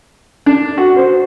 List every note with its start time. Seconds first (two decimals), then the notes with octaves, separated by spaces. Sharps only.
0.46 D4
0.78 F#4
0.96 C5